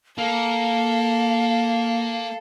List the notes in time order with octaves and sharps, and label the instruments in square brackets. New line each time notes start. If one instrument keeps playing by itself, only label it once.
[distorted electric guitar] A#3 [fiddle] A4 [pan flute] F5